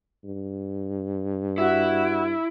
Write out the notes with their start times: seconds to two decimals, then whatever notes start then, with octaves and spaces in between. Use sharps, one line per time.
0.24 G2
1.58 E4 F#4